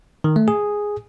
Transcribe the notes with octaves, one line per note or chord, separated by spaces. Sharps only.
D#3
A3
G#4